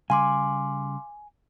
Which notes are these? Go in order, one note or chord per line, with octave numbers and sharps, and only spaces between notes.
C#3 G3 F5 G#5 C6 D6